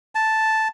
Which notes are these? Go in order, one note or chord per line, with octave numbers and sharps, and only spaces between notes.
A5